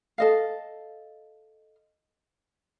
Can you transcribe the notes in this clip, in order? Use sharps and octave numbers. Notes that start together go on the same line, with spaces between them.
A4 D#5 F5